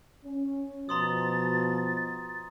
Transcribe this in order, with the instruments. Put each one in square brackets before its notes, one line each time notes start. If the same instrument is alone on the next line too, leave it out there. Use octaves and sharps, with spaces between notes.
[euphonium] C#4
[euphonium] B2 [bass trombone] F3 [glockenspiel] A#5 C6 D#6 [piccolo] A6